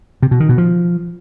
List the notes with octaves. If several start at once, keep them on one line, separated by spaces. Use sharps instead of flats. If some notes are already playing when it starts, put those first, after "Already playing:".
C3
B2
D#3
B2
F3